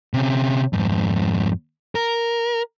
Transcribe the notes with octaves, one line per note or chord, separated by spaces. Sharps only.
C3 C#4
F2 G#2
A#4